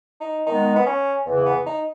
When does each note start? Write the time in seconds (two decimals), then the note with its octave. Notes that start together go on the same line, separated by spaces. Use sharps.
0.21 D#4
0.47 D#3 G#3 B3 D#4
0.76 B3
0.86 C#4
1.26 E2 C#3 E3
1.46 B3
1.66 D#4